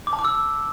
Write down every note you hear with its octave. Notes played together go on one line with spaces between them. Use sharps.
D6
A5
D6
E6